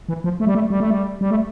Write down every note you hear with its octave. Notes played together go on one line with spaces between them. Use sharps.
E3
F3
A3
G3
A3
G3
A3
G3
G3
A3